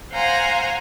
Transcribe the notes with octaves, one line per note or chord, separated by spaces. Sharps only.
C5 F5 F#5 G#5 A#5 C6